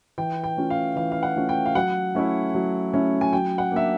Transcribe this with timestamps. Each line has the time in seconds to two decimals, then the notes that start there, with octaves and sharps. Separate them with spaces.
0.18 E3 G5
0.44 G5
0.57 A3 C#4 F4
0.70 F5
0.96 E3 F5
1.12 F5
1.23 F#5
1.36 A3 C#4 F4
1.49 G5
1.66 F5
1.75 F#3 F#5
2.15 A3 C#4 E4
2.54 F#3
2.93 A3 C#4 E4
3.21 G#5
3.33 F#3 G5
3.58 F#5
3.71 A#3 D4 E5